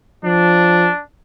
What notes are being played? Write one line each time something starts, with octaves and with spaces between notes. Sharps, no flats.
F3 D4